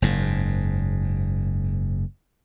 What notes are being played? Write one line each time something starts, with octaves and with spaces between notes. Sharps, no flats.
F#1 G#2